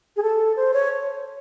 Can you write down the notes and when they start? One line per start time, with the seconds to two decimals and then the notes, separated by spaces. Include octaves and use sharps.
0.17 G#4
0.22 A4
0.56 C5
0.74 C#5